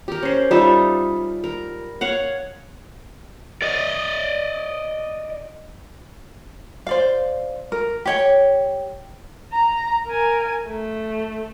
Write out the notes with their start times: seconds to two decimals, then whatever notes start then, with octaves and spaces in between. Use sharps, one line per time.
0.08 G4 A#4
0.23 C#4 C5
0.51 G3 D#4 F4 E5
1.44 A#4
2.01 C#5 F5 F#5
3.62 D5 D#5
6.87 C5 D5 F5
7.72 A#4
8.05 G4 C#5 G5
9.53 A#5
10.07 A#4 G#5
10.67 A3